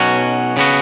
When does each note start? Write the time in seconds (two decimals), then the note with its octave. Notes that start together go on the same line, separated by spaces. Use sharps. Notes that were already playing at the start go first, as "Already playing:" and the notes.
Already playing: B1 B2 F#3 C#4 F#4
0.57 C#3 B3 F#4